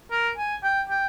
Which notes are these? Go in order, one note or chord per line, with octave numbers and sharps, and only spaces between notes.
A#4
G#5
G5
G5